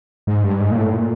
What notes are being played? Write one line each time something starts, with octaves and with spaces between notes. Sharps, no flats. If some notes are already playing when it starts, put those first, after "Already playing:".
G#2
G2
G#2
A#2
A2
A#2